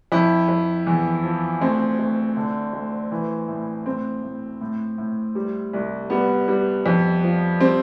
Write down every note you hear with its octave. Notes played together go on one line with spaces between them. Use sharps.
F2 E4
F2
E2
F3
D2 C4
D2
D3
D2
E3
A2
A2 C4
A2
A2
A2
G3
C2
G3 B3
G3
F2
F3
G3 C4